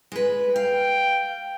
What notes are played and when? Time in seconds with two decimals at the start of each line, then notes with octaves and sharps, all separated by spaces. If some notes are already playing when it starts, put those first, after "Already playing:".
0.12 G#3 B4
0.56 F5 G5